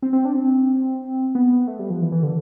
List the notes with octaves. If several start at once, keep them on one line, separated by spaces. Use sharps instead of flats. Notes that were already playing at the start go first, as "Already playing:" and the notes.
C4
C4
D4
C4
B3
A3
G3
F3
E3
E3
D3